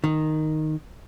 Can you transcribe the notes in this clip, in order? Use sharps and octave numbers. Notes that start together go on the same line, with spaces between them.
D#3